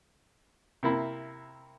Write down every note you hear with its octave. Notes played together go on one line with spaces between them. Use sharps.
C3 A#3 E4